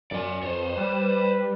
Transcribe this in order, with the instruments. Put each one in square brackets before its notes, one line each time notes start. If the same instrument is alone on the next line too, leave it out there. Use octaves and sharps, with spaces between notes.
[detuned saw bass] F#2 [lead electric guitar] D5 G#5
[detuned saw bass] F2 [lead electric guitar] C5 C#5
[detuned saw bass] G3 [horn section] B4